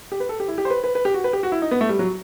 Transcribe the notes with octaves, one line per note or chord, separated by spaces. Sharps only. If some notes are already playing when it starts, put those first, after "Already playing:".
G4
B4
A4
G4
E4
G4
C5
B4
B4
B4
G4
F#4
B4
G4
F#4
E4
D#4
B3
A3
G3
F#3